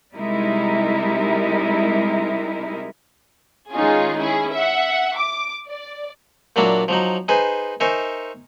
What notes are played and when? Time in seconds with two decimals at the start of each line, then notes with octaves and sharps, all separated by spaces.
0.14 C3 G3 G#3 D#4 E4 A#4
3.72 D#3 G#3 C#4 D#4 F4 G#4
4.21 C#4 E4 G#4
4.55 E5 F#5
5.17 D6
5.70 D5
6.56 A#2 F#3 A#3 D4 E4 F#4
6.88 F3 F#3 D#4
7.28 D#4 G#4 B4 C5 G#5
7.80 D#4 A#4 C5 E5 G#5 C#6